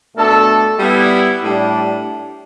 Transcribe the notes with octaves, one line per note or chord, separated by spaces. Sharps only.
B2 A3 D4 A4
G3 B3 E4
A2 G3 D4